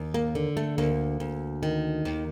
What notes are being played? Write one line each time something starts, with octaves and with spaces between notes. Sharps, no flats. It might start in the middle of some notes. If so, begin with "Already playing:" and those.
Already playing: D#2
A#3
D3
A3
D2 A#3
D2
D#3
D#2